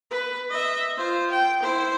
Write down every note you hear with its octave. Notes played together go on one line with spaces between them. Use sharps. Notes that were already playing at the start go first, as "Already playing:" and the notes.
B4
D#5 E5
F4 C5
G5
E4 C5